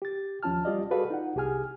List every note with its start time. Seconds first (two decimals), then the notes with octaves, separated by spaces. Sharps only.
0.02 G4 A6
0.43 D#2 F3 C#4 F4 A5 F6
0.65 G3 F4 G4 D5 D#5
0.91 F#4 G#4 A4 B4 D5 F5
1.10 D#4 F4 F#5
1.36 C2 G4 G#4 G#5 F6